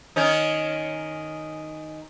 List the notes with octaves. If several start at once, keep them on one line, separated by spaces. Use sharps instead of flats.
D#3 C#4 D#4